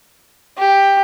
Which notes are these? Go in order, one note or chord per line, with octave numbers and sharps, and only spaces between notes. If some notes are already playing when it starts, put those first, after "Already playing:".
G4